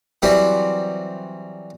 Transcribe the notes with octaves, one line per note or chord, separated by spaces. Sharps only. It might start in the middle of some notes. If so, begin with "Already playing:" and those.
E3 F#3 G3 C4 G4